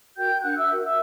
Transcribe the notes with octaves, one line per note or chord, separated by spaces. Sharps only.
F#4 A#4 G5 G6
D4 F#5 F#6
E5 E6
F#4 A#4
E5 E6